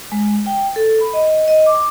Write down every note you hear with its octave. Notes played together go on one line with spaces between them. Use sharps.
G#3
G5
A4
B5
D#5
D#5
D6